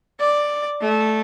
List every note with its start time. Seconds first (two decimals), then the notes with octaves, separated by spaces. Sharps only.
0.19 D5
0.81 A3